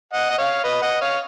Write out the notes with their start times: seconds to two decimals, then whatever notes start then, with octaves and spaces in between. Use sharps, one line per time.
0.13 D#5 F#5
0.30 D#5
0.38 C#5 F5
0.64 B4 D#5
0.82 D#5 F#5
1.01 C#5 F5